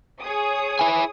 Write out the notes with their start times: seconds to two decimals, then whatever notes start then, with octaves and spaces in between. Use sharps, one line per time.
0.21 G#4 C#5 D#6
0.79 E4 G#5